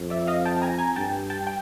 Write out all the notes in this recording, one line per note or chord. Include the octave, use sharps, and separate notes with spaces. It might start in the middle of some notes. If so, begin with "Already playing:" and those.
Already playing: F2
D5 E5
D#5 F5
G5 A5
G#5 A#5
G#5 A#5
G2 G5 A5
G5 A5
G5